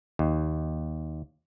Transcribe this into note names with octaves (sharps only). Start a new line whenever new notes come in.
D#2